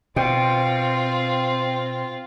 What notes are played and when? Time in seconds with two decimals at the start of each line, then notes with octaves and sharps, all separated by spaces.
0.16 B2 C4 F4 G5